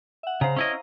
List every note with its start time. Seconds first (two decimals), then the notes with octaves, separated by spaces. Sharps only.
0.23 E5 F#5
0.41 C#3 C5 F5 A#5
0.56 C#4 E4 D#5